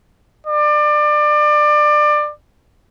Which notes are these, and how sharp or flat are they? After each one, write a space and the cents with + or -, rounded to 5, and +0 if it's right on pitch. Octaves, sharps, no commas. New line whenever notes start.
D5 +25